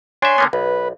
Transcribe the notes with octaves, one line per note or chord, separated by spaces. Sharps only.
D4 C#5 E5 G#5 C6
D3 A#3 B3
B1 B4